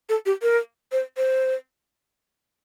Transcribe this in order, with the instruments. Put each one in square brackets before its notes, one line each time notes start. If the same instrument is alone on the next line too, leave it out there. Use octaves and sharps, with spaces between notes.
[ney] A4
G4
A#4
C5
C5